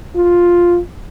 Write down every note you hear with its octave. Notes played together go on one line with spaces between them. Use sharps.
F4